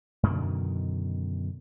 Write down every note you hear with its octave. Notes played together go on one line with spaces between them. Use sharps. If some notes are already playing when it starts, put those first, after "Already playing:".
F#2 B2 D3 D#3